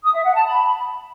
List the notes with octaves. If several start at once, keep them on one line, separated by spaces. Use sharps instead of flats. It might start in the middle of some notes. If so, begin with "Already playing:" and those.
D#6
E5
F#5
A5
B5